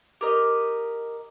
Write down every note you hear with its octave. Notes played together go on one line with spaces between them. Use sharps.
G4 A#4 D#5